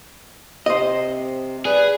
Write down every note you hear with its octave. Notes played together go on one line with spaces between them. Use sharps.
C3 C5 D#5
G#4 B4 D5